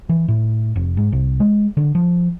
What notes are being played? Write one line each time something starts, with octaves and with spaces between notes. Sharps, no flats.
E3
A2
F1
G#2
C2
G#3
D3
F3